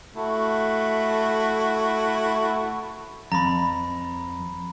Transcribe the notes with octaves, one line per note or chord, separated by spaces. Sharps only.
A3 E4 F#4
F2 A#5 B5